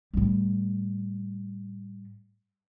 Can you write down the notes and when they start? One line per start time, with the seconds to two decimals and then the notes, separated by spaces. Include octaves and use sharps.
0.13 A2 G3